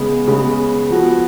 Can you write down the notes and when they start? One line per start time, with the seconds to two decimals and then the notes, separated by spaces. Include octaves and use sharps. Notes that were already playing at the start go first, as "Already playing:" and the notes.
Already playing: C#3 G#3 B3
0.27 C#3 G#3 B3
0.90 F3 B3 F#4